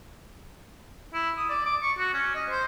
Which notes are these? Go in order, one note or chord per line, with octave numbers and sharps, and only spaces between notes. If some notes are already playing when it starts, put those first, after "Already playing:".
E4
D#6
D5
D6
C#6
F#4
C#4
D#5
C5